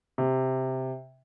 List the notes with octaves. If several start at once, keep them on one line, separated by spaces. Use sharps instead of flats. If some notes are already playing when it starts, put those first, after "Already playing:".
C3